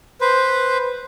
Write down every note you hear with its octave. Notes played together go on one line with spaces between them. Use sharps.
B4 C5